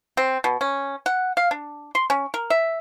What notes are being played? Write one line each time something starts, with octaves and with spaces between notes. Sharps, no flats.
C4
B2
C#4
F#5
F5
D4
C6
C#4
A#4
E5